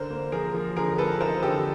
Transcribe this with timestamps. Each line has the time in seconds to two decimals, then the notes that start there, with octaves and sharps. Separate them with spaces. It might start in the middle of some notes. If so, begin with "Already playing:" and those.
Already playing: D3 A#4 C5
0.11 A#3
0.32 F3 G#4 A#4
0.54 F3
0.76 D3 G#4 A#4
0.98 A#3 A4 B4
1.20 D#4 A#4 C5
1.43 D3 G4 A4